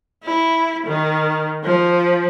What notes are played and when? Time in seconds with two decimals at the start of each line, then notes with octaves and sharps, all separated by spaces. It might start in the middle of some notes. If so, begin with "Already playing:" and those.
0.24 E4
0.87 D#3
1.64 F3